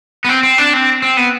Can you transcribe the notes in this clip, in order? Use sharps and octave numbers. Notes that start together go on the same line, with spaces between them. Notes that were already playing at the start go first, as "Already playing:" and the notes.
B3
C4
C4
D4
C4
C4
B3